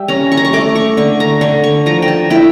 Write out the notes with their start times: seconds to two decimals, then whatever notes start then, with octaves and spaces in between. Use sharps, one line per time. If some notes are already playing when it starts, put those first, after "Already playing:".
Already playing: G3 E5
0.08 C#4 A#5
0.32 C#6
0.37 A#5
0.45 C#6
0.53 A3 D6
0.75 C#6
0.97 D3 C#6
1.20 A#5
1.41 D3 C#6
1.64 C#6
1.86 F3 A#5
2.02 G5
2.08 A5
2.30 E4 G5